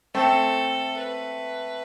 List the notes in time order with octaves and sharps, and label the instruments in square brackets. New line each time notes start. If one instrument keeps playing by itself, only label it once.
[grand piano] A3 C4 [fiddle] A4
[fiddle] B4